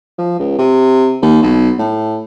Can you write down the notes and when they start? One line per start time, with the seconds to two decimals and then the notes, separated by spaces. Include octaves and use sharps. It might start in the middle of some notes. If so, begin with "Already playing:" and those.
0.18 F3
0.39 C#2
0.58 C3
1.22 D#2
1.42 B1
1.79 A2